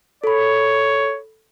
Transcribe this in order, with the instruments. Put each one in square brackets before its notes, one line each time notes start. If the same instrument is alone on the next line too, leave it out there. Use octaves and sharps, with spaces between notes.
[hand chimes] A4 B5 [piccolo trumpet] C#5